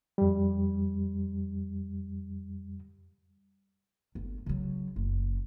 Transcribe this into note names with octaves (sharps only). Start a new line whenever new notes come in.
F2 G3
G1
C#3 F#3
F#1